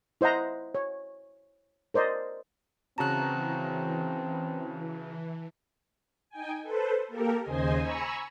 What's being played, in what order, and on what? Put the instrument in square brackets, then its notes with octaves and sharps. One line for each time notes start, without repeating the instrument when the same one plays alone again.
[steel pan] E4 C5 D#5 F#5 A#5
C#5
A#4 C5 D5 D#5
[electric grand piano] C#3 F#4 A#5 [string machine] E3 [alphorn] C4 [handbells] A5 F#6
[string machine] D#4 G5 G#5
A4 B4 C5
A#3 G4 A4 A#4
D#2 C#3 C5 D#5 G#5
G#5 A#5 B5 C#6 E6